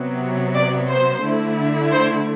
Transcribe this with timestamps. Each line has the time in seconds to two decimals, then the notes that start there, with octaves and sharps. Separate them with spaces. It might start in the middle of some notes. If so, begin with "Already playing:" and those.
Already playing: C3 F#3 B3
0.55 D5
0.89 C5
1.23 D3 A3 E4
1.91 C5